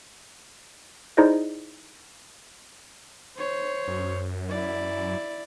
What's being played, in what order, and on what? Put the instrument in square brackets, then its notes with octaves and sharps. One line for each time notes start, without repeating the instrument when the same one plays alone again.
[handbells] D#4 E4 G#4 C5 D5 D#5
[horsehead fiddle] C5 C#5
[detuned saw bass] F#2
[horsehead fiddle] E4 D5